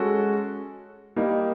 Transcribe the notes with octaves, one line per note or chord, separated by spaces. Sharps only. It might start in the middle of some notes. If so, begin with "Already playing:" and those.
Already playing: G#3 C#4 F#4 A4
G3 A#3 D#4